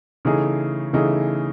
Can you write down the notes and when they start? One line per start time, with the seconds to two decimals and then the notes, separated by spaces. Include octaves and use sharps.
0.25 C#3 E3 A3 D#4 G#4
0.93 C#3 E3 A3 D#4 G#4